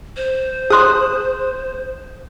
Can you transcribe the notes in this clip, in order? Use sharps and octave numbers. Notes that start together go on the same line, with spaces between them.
C5
G#4 C6 D#6 F#6